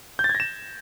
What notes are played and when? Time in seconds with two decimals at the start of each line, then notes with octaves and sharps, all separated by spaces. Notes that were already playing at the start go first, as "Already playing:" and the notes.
0.19 G6
0.24 A6
0.29 G#6
0.35 A#6
0.40 E7